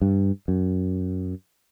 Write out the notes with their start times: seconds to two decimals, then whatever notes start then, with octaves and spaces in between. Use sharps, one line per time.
0.02 G2
0.48 F#2